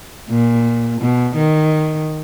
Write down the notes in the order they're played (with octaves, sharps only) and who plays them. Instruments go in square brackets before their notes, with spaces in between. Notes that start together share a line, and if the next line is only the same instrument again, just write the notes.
[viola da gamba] A#2
B2
D#3